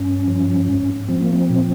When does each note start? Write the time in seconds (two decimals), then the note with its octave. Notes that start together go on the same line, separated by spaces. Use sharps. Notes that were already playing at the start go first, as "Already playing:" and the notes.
Already playing: G2 C#4
0.27 F3
0.69 G#2
1.08 F3 C4
1.22 A#3
1.33 C4
1.50 A#2